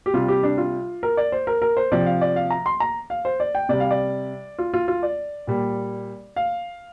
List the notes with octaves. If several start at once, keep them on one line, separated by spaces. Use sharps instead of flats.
G4
C3 G3 F4
G4
D4
F4
A#4
D5
C5
A#4
A#4
C5
C3 F3 D5
F5
D5
F5
A#5
C6
A#5
F5
C5
D5
G5
C3 G3 D5
F5
D5
F4
F4
F4
D5
A#2 G3
F5